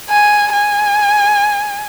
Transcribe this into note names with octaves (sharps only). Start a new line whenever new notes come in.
G#5
G#5